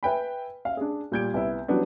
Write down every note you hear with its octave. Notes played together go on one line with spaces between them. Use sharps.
B4 E5 G5 G#5 B5
E5 F5
D4 G#4
A#2 G3 G6 G#6 D7
C2 B3 E4
E3 F#3 G3 B3 C#4 D4